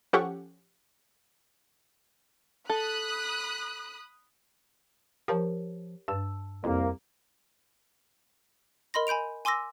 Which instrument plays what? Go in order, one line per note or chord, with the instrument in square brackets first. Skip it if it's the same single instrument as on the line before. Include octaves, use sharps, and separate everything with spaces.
[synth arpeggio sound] F3 C#4 G4 A4 F#5 C#6
[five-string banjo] A4 [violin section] B5 D#6 F#6
[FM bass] F3 [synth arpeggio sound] G4 A#4 C#5
[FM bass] G2 [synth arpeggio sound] A5 E6
[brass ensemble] C2 A#3 [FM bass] F2
[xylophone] A#4 D#5 B5 C6 A#6
G#5 B5 G6 D7 F7
G#5 C6 D6 E6 A#6